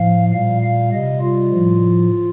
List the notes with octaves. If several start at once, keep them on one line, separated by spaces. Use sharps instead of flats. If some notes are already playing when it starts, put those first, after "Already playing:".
Already playing: A2 F3 F5
A#2 G3 F5
F5
C3 G3 D#5
F4
A2 F3